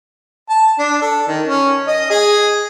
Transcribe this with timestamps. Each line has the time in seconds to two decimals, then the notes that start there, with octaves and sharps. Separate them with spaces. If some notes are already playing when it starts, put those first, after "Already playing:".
0.50 A5
0.79 D4
1.02 A4
1.27 D#3
1.46 C#4
1.87 D#5
2.10 G#4